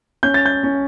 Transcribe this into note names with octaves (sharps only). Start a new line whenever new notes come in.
C#4 G6
A6
G6
C#4